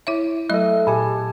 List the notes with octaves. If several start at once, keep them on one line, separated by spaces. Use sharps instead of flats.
E4 C#5 E5
F#3 A3 A4 D#5
A#2 G4 G#5 A5